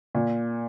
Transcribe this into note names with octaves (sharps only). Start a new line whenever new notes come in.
A#2